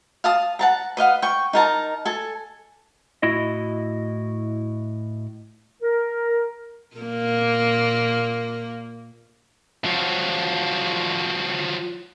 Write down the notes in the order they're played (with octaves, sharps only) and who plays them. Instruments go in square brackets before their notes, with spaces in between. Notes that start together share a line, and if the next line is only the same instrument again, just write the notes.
[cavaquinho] F5 A5 D#6
F#5 A5 A#5
B4 D#5 F5 F#5
G5 C#6
D#4 A#4 A5 A#5
A4 G#5
[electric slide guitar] A2 E4 F#4 D#5
[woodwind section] A#4
[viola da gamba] A#2 A#3
[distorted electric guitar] F3 F#3